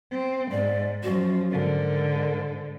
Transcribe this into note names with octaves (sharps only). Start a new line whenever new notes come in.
C4
G#2 D5
F#2 F3 F#4
G#2 D3 A#4